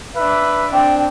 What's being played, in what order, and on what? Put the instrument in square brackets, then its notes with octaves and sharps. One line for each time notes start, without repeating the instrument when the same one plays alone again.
[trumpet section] D4 B4 E5
[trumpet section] C4 D4 [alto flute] G5